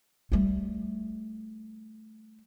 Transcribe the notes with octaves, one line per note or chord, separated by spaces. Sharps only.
G3 A3